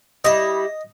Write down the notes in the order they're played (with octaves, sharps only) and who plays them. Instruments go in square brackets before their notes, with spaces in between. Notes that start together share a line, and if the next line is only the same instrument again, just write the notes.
[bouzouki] G3 E4 [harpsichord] D#5